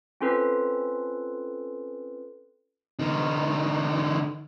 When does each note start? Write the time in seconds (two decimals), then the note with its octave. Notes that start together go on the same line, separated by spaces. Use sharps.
0.21 C4 C#4 F4 A4 B4
2.99 D3 D#4